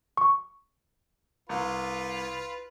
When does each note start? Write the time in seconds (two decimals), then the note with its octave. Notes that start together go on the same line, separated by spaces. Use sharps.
0.17 C#6
1.49 C2 F4 B4